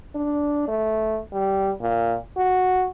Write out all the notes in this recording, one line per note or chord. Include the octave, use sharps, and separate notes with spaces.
D4
A3
G3
A#2
F#4